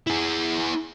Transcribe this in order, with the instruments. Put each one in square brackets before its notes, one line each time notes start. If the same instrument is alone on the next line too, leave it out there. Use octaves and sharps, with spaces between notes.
[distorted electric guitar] E4 G#4